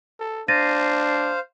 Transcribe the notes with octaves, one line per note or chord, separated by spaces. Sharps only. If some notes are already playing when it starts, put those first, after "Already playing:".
A4
D4 C5 F5 A6 A#6 D#7